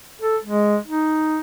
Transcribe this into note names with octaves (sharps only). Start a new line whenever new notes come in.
A4
G#3
D#4